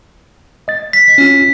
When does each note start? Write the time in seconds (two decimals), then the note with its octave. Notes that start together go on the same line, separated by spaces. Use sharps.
0.68 D#5 A6
0.93 B6
1.18 C#4 F4